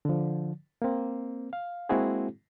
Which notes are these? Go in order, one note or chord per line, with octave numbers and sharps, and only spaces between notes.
D3 F3
A#3 C4
F5
G#3 A#3 C4 E4 F#4 G#4